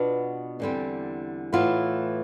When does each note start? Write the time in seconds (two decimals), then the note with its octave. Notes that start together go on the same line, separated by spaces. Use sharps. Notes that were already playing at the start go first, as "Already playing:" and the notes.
Already playing: B2 B3 D4 F4
0.60 E2 D3 G3 C4
1.53 A2 E3 B3 F4